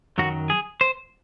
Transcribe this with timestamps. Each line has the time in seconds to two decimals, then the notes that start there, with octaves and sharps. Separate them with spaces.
0.18 F#2 D#3 F#3 F#4
0.50 G#4
0.81 C5